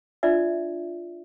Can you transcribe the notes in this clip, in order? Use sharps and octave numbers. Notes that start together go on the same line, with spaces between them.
D4 F4 D5 E5